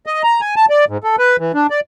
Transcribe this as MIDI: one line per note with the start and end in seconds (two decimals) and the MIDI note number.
0.06 0.22 75
0.24 0.41 82
0.41 0.55 80
0.56 0.66 81
0.69 0.85 74
0.88 0.98 44
1.04 1.16 69
1.19 1.37 71
1.39 1.52 52
1.54 1.67 62
1.70 1.80 74